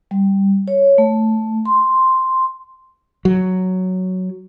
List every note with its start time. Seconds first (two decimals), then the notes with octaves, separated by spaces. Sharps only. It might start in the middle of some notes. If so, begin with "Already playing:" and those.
0.11 G3
0.68 C#5
0.98 A3
1.66 C6
3.25 F#3